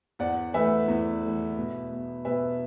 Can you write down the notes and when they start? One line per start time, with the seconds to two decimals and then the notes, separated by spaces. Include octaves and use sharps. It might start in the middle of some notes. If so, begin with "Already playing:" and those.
0.19 E2 D5 F#5
0.54 E3 A3 B4 E5
0.88 E2
1.22 E3 A3
1.57 B2
1.91 B3
2.25 B2 B4 E5